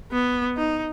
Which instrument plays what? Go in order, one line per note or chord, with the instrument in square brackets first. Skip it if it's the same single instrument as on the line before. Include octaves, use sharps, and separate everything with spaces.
[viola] B3
D#4